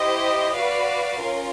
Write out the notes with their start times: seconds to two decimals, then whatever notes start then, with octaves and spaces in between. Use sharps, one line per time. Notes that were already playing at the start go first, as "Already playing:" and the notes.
Already playing: E4 G4 C5 D#5
0.55 F#4 B4 D5 F5
1.20 C#4 F4 A#4